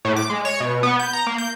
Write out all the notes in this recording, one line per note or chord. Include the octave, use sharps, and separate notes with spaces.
A2
D6
G#3
C#5
B2
B3
G6
A#5
A#3
G6